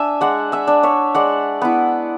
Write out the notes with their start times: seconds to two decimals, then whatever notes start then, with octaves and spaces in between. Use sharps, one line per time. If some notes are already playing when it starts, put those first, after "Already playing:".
Already playing: D4 E5 G#5
0.21 G#3 D5 F#5
0.52 E5 G#5
0.67 D4
0.83 C#5 E5
1.15 G#3 D5 F#5
1.62 B3 E4